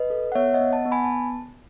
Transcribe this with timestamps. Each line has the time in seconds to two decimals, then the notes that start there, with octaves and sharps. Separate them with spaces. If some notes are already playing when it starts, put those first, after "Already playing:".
Already playing: B4 D#5
0.10 A4
0.32 F#5
0.35 B3 C#5 E5
0.54 D#5 F#5
0.60 B3
0.73 F#5 A5
0.85 B3
0.92 G#5 B5
1.04 A5